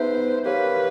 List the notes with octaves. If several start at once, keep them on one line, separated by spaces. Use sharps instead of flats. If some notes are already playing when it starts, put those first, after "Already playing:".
Already playing: B3 D#4 G#4 B4 C5 E5
G4 A#4 B4 C#5 F5